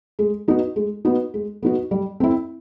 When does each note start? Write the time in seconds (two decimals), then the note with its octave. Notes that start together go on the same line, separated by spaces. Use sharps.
0.19 G#3
0.48 B3 D#4 F#4
0.76 G#3
1.05 B3 D#4 F#4
1.34 G#3
1.63 B3 D#4 F#4
1.91 G3
2.20 C4 E4